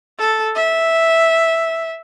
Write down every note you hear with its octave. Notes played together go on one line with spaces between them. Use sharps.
A4
E5